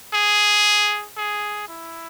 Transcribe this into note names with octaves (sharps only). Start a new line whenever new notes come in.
G#4
G#4
E4